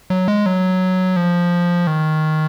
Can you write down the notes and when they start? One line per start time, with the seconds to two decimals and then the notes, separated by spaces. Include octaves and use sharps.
0.10 F#3
0.28 G#3
0.46 F#3
1.16 F3
1.87 D#3